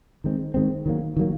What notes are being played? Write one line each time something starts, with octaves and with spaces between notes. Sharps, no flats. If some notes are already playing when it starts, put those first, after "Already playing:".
D#3 G#3 C4
D#3 G#3 C4
D#3 F#3 A#3
D#3 F#3 A#3